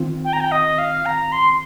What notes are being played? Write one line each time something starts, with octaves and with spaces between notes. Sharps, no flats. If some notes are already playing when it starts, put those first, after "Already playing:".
Already playing: D#3 C4 F4
G5
A#5
G5
D#5
F5
A#5
C6